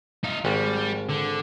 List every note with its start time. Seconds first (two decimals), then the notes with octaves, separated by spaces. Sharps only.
0.24 D#4 F4
0.45 G#1 G3
1.09 D3